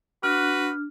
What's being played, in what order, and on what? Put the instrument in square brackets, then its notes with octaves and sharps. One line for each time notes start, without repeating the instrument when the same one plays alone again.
[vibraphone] D4 [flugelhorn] F#4 [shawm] B4 [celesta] F6